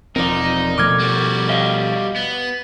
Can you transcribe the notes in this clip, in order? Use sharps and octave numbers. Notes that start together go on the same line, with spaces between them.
E1 F3 C4 D#4 A#4 D5
B2 F3 A3 D6 F6 G#6
G3 F#4
D#5 F5
B3